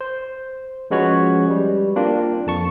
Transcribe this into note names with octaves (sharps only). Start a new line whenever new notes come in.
C5
F3 G#3 C#4 F#4 B4 C#5
G3
A#3 C4 D4 F4
F2 A5 C#6